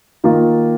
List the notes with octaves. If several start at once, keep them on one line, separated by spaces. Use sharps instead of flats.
D#3 A#3 F4 A#4